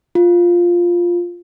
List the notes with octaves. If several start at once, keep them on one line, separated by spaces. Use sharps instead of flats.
F4